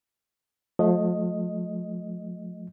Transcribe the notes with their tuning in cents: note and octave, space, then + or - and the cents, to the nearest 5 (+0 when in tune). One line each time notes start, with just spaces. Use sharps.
F3 +30 A3 -25 D#5 +0